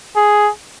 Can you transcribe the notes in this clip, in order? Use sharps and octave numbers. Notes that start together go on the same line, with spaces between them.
G#4